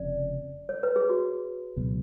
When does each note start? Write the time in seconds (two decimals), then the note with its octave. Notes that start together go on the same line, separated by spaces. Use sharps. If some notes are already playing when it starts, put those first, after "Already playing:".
Already playing: F1 F2 C#3 D5
0.69 C#5
0.83 B4
0.96 G#4
1.09 F#4
1.76 C#2 B2 F#3